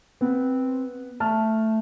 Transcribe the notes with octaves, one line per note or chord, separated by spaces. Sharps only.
B3 C4
A3 A5 F6